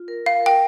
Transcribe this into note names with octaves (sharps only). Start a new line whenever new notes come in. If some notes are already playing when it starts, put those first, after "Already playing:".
Already playing: F4
A#4
F5
A#4 G5